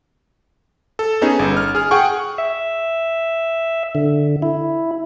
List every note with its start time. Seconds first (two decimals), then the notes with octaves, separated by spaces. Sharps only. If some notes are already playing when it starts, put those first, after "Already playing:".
0.99 A4
1.22 B3 C#4 D#4 G#4
1.39 G1
1.57 F6
1.75 G#4 F6
1.91 G#4 F#5 G5 C#6
2.38 E5
3.95 D3
4.42 E4